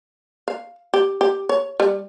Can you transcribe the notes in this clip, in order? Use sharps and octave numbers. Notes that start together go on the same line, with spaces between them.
F5
G4
G4
C#5
G3